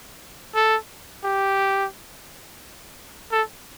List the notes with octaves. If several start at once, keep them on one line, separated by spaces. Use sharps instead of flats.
A4
G4
A4